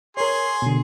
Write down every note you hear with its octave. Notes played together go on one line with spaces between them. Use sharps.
G#4 A#4 C#5 C6
B2 D3